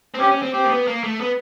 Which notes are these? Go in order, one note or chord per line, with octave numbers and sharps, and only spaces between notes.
C4
C#4 G4
C#4
C4
C4 G4
A#3
B3
A#3
A3
B3